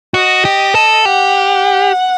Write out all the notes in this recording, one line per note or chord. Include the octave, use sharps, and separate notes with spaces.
F#4 D#5
G4
A4
G4 F#5